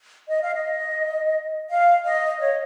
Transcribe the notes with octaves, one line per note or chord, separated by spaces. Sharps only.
D#5
F5
D#5
F5
D#5
C#5